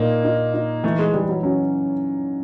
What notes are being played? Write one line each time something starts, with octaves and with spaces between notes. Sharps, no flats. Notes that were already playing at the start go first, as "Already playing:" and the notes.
Already playing: A#2 A#3 D#4
D#4
D#4
E3 A3
G#3
E3 G3
F#3
F#3 C#4